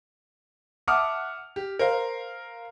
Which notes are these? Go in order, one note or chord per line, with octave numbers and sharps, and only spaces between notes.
E5 F#5 A5 D6 D#6 F6
G4
A#4 C5 F5